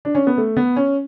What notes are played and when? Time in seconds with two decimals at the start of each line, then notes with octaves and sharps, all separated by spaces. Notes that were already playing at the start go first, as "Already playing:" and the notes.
0.05 D4
0.15 C#4
0.27 B3
0.37 A3
0.57 B3
0.76 C#4